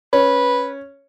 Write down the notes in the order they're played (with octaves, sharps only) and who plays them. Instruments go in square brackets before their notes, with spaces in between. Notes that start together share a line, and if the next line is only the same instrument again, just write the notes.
[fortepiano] C#4 [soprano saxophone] B4